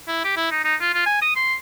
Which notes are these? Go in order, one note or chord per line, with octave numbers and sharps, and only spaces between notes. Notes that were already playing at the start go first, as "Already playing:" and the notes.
E4
G4
E4
D#4
D#4
F4
F4
G#5
D#6
C6